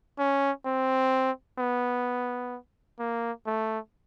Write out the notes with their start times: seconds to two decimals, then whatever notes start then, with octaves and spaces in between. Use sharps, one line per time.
0.19 C#4
0.66 C4
1.59 B3
2.99 A#3
3.46 A3